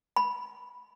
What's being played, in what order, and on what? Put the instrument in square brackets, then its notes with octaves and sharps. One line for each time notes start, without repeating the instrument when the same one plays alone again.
[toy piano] B5